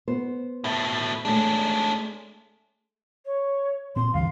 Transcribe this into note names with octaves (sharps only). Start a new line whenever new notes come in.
B3 C5
B2 A3
G#3 A3 C#4 D4
C#5
A#2 C4 C6
D2 G2 E3 F5